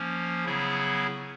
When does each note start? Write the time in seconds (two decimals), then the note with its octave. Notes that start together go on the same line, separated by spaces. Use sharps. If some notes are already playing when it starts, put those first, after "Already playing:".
Already playing: F3 A#3 C#4
0.45 C#3 F#3 B3 E4 G#4